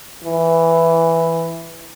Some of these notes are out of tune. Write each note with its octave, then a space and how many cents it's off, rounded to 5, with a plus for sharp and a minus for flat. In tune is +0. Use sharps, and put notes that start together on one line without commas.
E3 +5